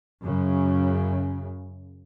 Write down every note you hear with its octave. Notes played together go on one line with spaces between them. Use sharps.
F#2 C#3